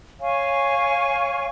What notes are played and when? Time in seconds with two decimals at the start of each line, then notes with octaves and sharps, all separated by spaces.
0.20 C#5 F5 G#5 C#6